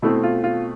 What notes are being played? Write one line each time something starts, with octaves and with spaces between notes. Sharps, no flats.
B2 A3 C4 E4
F4
F4